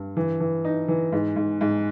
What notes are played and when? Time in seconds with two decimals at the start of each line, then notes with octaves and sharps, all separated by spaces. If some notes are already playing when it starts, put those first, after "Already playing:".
Already playing: G2
0.17 E3
0.40 E3
0.65 D#4
0.88 E3
1.12 G#2
1.36 G#2
1.61 G#2